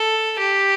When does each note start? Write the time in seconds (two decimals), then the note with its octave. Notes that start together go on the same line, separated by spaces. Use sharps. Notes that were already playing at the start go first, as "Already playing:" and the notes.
Already playing: A4
0.39 G4